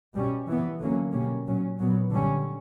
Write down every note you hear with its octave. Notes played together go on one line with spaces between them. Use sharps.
B2 G3 C#4
E3 B3
D3 F#3 A#3 C#4
B2 G3 A#3 C#4
A#2 F#3 C#4
A#2 F#3 B3
D3 G3 C#4